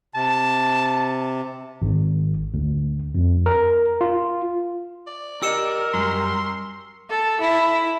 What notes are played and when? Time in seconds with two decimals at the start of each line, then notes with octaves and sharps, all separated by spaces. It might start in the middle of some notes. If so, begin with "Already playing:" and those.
0.15 C3 A5
1.82 G#1
2.54 D2
3.15 F2
3.46 A#4
4.01 F4
5.07 D5
5.42 G4 A#4 D#5 E6 C#7 E7
5.94 F#2 G3 C6
7.10 A4
7.41 E4